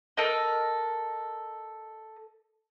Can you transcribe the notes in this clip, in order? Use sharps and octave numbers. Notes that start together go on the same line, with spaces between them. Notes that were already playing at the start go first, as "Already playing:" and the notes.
A4 A#4 D#5